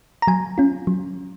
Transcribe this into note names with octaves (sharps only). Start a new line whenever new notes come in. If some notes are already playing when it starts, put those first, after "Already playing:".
A#5
F#3 G#5
C#4 F4
F#3